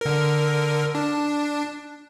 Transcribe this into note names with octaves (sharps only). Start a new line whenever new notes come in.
D3 A#4
D4